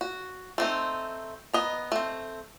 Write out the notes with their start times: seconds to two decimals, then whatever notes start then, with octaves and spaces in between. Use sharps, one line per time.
0.01 F#4
0.58 A3 C4 D#4
1.53 B3 D#5 A#5
1.92 A3 C4